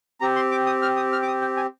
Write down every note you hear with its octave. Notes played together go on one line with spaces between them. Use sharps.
C4 G4 A#5
C6
D6
D#6
F6
D#6
F6
D6
D#6
G5
G#5